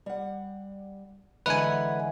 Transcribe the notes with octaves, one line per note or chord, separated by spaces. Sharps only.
G3 F#5
D3 E3 G#3 A4 B4 F#5 G#5 A#5